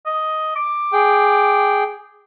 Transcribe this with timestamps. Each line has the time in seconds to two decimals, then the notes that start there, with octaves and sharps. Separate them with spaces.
0.06 D#5
0.56 D6
0.93 G#4 G5